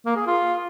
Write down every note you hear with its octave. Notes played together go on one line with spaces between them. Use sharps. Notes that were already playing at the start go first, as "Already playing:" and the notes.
A#3
G#4
F4